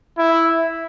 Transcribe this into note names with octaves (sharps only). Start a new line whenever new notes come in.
E4